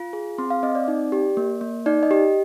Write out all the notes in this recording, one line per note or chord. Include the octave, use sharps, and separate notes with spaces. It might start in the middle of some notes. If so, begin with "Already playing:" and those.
Already playing: F4
G#4
C4 C6
F5
C4 D#5
D5
D#4
G4
A#3
A#3
D#4 D5
D#5
G4